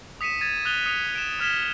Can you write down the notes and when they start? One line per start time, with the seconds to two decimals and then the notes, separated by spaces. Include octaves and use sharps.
0.21 D#6 B6 C#7 D#7 E7
0.41 G#6 A6 D#7
0.65 D#6 F#6 A6 D#7 F7 G7
0.86 D#6 C#7 F7
1.15 D7 E7
1.40 D#6 F6 G#6 B6 E7 G7